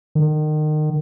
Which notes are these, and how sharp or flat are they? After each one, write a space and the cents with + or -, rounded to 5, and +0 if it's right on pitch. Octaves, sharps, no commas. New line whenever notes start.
D#3 -30